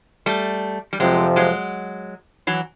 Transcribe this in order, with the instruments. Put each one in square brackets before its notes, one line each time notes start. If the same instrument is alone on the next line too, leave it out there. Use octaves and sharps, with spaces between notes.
[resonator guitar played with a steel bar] G3 A3
G3
[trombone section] F2 C3 F3 [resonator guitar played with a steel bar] F#3 G#3
[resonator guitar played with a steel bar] F#3 G#3
E3 F#3